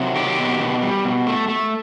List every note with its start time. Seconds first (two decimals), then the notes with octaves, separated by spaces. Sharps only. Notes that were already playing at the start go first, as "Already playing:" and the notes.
Already playing: C3 F#3
0.15 D#3 G4
0.38 B2
0.60 B2
0.82 G3
1.05 B2
1.27 A3
1.48 A3